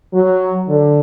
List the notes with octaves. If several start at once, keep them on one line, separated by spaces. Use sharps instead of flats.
F#3
D3